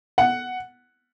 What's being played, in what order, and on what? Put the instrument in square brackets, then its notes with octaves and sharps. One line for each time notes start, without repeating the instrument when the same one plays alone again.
[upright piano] F#5